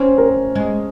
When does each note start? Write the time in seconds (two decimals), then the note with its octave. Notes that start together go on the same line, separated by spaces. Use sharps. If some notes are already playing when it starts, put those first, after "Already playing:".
Already playing: C4 C#4 C#5
0.18 A#4
0.55 G#3